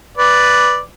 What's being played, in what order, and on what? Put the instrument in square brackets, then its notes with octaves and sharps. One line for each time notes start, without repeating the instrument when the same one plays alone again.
[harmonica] B4 D5